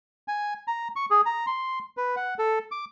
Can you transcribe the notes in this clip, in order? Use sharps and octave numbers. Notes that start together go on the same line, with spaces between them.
G#5
A#5
C#6
G#4
A#5
C6
B4
F#5
A4
D6